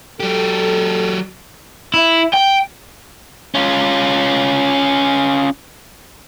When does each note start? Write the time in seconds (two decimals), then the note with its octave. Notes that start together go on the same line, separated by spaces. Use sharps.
0.20 F#3 G4 A4
1.94 E4
2.33 G5
3.55 C#4 F4